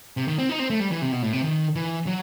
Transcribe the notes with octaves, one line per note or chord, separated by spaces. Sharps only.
C3
D#3
C4
D#4
C4
A3
G3
E3
C3
B2
A2
C3
D#3
E3
F#3